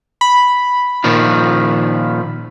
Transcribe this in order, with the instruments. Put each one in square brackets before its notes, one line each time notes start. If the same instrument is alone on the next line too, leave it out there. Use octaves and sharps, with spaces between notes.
[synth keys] B5
[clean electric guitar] A#2 D#3 F3